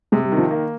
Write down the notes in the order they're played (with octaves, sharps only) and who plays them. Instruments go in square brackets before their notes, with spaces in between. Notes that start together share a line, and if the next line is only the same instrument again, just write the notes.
[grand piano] C3 [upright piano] G#3
[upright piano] G3
[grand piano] D#3
[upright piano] F3
[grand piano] A#3